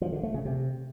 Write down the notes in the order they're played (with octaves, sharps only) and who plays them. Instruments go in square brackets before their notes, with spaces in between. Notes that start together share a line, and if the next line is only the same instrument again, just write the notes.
[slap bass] F3
D3
A3
C#3
C3